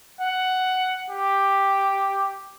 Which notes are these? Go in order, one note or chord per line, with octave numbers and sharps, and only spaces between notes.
F#5
G4